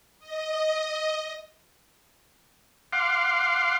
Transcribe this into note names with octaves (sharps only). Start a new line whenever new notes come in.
D#5
F5 F#5 C6 D6